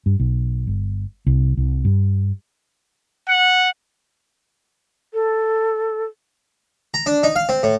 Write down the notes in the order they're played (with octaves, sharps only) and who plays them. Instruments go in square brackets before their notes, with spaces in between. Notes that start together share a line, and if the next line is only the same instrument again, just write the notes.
[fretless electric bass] G2
B1
G1
C2
C2
G2
[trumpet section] F#5
[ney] A4
[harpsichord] A#5
D4
D#4
F5
C4
A2